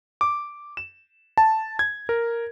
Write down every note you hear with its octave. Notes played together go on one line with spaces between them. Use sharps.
D6
E7
A5
G#6
A#4